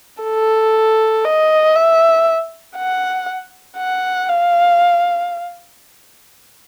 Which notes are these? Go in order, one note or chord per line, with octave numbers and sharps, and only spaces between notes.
A4
D#5
E5
F#5
F#5
F5